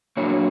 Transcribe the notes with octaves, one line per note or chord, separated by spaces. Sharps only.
A#2 F#3 A#3 D4 C#5